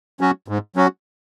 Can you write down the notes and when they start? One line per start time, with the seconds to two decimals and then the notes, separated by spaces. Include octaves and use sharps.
0.21 F#3 C#4 F#4
0.48 G#2
0.76 F#3 C#4 F#4